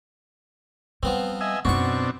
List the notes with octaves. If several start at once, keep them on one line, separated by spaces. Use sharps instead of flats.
F3 G3 B3 C4
D#5 E5 G#5
F#2 B2 C4 D4 D#4 F#4 C#6